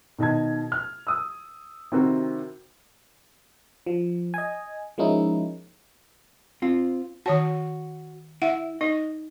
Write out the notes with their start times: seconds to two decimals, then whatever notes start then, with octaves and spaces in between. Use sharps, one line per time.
0.19 B2 D#3 D#5 A5 G#6
0.72 F6
1.07 D#6 E6
1.92 C3 D#3 C4 E4 F#4 A#4
3.86 F3
4.34 D#5 G#5
4.98 F3 G#3 A#3 C#4 D#4 E4
6.62 C4 F4
7.26 D#3 F#4 C#5 A5
8.42 E4 E5 F#5
8.81 D#4 D#5